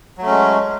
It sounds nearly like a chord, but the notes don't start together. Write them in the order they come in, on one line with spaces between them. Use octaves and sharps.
F#3 A3 C#4 G#3